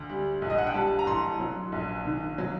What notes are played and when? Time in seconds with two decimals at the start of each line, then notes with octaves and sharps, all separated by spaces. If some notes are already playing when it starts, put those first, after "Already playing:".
Already playing: D2
0.09 G3
0.42 A#1
0.50 D#5
0.58 F#5
0.67 G5
0.74 G3 A5
0.99 A#5
1.07 A1 C6
1.40 F#3
1.72 A#1
2.05 D#3
2.38 F#3